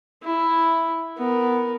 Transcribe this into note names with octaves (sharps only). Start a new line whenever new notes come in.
E4
B3 A#4